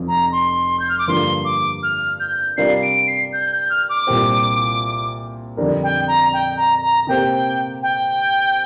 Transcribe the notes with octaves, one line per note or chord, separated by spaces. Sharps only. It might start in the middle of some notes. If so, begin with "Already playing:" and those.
Already playing: F1 F2 F3
A#5
C6
G6
F6
D6
G2 D3 F3 A#3 C6
D6
F6
G6
C3 G3 D4 F4 A#4 C7
D7
C7
G6
G6
F6
D6
C2 A#2 A#3 G4 C5
F2 D3 G3 D4 A#4
G5
A#5
G5
A#5
A#5
C3 A#3 G4 C5 G5
G5